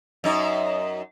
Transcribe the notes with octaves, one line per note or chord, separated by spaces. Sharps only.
F#2 D#4